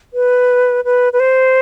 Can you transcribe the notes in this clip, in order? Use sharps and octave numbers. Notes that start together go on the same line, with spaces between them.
B4
B4
B4
C5